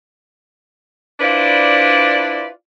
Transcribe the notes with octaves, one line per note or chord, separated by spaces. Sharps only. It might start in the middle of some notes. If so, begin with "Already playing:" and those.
D4 E4 F4 B4 C5 D5